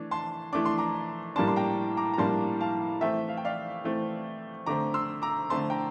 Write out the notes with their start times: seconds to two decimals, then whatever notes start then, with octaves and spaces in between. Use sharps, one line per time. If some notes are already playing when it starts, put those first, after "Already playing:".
Already playing: E3 A3 D4
0.11 A5 C6
0.53 E3 A3 D4 D6
0.65 C6
0.78 A#5 D6
1.36 A2 G3 A#3 D4 A5 C6
1.48 C6
1.56 G5 A#5
1.97 A#5 D6
2.14 A#5
2.18 A2 G3 A#3 D4 A5 C6
2.61 F5 A5
3.01 E3 A3 C4 E5 G5
3.29 F5
3.37 G5
3.45 D5 F5
3.84 E3 A3 C4
4.66 D3 A3 C4 A#5 D6
4.94 C6 E6
5.22 A#5 D6
5.50 D3 A3 C4 A5 C6
5.70 G5 A#5